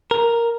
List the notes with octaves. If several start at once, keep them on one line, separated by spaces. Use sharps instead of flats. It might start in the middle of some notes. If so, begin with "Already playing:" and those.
A#4